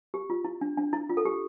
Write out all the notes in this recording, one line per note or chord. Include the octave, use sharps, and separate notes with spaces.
G4
F4
E4
D4
D4
E4
F4
A4
G4